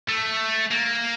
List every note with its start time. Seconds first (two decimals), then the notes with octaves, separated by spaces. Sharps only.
0.09 A3
0.71 A#3